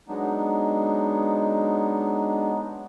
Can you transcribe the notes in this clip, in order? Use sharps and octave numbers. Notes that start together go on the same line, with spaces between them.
F#3 G#3 B3 D4 D#4